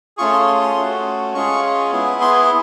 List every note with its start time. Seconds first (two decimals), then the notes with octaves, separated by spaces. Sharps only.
0.17 A3 C#4 F4 G#4 C#6
0.33 C6
0.47 C6
0.61 C6
0.76 A3 C#4 F#4
1.34 G#3 C#4 F4 G#4 C#6
1.92 B3 E4 G#4
2.21 C6